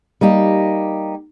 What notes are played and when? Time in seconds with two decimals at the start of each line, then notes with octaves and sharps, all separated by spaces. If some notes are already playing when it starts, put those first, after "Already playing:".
0.21 G3 A#3 D#4 G4